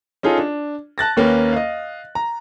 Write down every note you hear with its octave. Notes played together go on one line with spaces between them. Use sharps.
C#4 D#4 F4 G#4 A4
D4
A5 F#6 A6 A#6
D#2 A#3 C#4 B4
D#5 F5
A#5